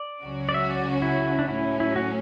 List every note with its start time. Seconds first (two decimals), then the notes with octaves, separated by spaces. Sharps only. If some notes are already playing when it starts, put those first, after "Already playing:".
Already playing: D5
0.23 C#2 C#3 F#3 C#4 F#4
0.49 D5
0.54 E5
0.70 D5
1.02 E4
1.39 D4
1.48 A2 F#3 C#4 E4
1.80 E4
1.96 F#4